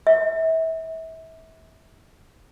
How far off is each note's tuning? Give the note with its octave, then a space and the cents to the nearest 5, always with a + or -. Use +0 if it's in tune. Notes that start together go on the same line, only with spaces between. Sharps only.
E5 -30